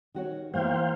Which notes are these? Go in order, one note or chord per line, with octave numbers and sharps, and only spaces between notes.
D#3 F#4 C#5
E3 A#3 B3 C5 F5 G5